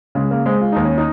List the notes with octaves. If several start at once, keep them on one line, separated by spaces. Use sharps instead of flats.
C#3 G#3
A#3
G#3 C4
F4
D#2 D#4
C#4
D#4